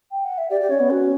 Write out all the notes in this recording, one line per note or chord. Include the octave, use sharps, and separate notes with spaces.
G5
F#5
E5
G4 D5
G4
C#4 C#5
B3
C#4 F#4